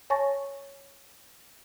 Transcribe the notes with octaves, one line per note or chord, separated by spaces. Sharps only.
C#5 G#5 A5 C#6 A6 A#6